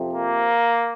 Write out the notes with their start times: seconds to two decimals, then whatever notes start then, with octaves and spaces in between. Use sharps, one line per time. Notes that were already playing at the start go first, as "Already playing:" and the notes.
Already playing: F2 C3 F3
0.13 A#3